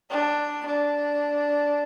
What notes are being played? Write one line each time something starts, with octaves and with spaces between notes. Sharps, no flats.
D4
D4